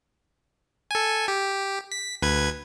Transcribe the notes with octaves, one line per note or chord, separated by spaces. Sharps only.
A4 G#5
G4
B6
D2 B4 G#6